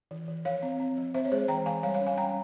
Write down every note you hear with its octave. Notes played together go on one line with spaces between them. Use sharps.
E3
E3
F3 C#5 F5
C4
C4
F3
C4 C5 E5
C#5
G#3 G#4 C5
E3 G5 A#5
E3 F5 G#5
G3 C#5 F5
C#5 F5
C#4
F5 G#5
C#4 G5 A#5